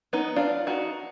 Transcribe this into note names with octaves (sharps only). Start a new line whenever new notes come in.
B3 D#4
D4 F4
D#4 F#4